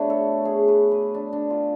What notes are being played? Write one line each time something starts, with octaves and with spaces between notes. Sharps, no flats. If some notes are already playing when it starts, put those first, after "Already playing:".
Already playing: B2 A3 D4 B4 C#5
A4
G#4
B4
B4
D4
D4
F4